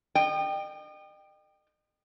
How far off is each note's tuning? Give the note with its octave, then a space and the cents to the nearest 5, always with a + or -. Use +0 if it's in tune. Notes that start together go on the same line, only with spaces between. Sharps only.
D#5 -35 G5 +0